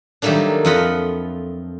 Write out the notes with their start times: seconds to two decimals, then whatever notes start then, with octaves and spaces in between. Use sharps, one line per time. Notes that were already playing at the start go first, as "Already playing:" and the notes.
0.22 D#3 F#3 G3 A3 A#3 D4
0.65 F2 F4 D#5 F#5 B5